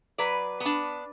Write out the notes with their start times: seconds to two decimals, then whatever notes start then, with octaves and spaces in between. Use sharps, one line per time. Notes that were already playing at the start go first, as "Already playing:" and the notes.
0.18 F#3 B4 D5
0.60 B3 D4